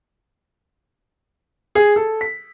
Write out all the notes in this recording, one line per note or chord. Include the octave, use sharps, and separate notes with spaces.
G#4
A4
B6